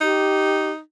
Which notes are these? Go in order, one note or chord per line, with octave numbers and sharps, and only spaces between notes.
D#4 G4